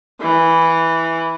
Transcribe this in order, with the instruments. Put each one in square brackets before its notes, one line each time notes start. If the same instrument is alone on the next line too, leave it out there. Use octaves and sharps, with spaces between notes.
[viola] E3